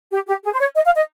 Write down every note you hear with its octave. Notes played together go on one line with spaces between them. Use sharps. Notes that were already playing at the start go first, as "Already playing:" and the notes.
G4
G4
G#4
C5
C#5
D#5
F5
D#5